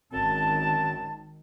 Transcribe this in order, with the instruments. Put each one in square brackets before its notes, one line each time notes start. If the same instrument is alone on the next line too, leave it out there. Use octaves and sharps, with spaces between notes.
[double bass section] G#1 D#3 [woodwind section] F#2 C4 A5